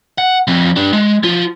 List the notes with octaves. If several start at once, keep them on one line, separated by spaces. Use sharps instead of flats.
F#5
F3 C4
G3 D4
G#3
F3 F4